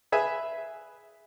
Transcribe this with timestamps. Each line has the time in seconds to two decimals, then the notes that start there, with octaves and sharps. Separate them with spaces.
0.12 G#4 B4 E5 G#5